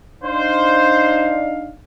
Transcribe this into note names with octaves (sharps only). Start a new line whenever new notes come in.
D4 D#4 C5 F5